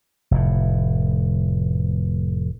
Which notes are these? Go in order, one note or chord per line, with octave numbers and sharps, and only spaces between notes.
F1 A2